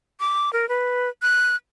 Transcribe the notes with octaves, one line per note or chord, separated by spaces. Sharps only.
D6
A#4
B4
F#6